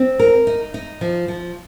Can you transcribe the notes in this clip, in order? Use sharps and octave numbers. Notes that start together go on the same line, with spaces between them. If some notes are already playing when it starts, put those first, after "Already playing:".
Already playing: C4
A#4
D#4
D#4
F3
F3